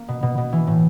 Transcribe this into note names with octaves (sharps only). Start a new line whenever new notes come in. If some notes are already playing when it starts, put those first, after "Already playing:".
Already playing: A#3
B2
B2
B2
E3
A2